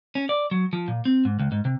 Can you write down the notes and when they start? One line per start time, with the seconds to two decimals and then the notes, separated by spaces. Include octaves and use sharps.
0.15 C#4
0.29 D5
0.51 F#3
0.73 F3
0.88 A#2
1.05 C4
1.25 G#2
1.39 C#2
1.52 G#2
1.65 C3